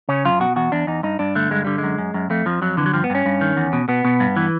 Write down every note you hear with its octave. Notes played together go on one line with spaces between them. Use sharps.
C#3 C#4
F#2 F4
B2 F#4
E2 F#4
E2 D4
E2 D#4
G2 D#4
G2 D4
D3 A3
G2 G#3
D3 G3
G#3
F#2
F#2
F#2
F2 A3
F2 F3
F2 F#3
D3 E3
F#3
G2 F3
B3
G2 C#4
G2
D#3
E2
B2
B2 B3
B2
G2
E3